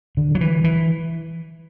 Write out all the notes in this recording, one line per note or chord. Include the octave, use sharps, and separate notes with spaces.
D3
F#3
E3
E3